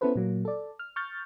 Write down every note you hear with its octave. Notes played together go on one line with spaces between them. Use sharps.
B3 C#4 E4 A4 B4 C5
A#2 F#3 A#3
A4 D5
F6
C#6 F6 G6 A6